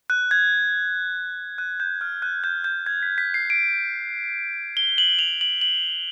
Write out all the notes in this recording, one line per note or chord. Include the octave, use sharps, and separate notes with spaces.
F#6
G#6
F#6
G6
F6
F#6
G6
G6
G#6
B6
B6
C7
D7
G7
F#7
F7
F#7
F#7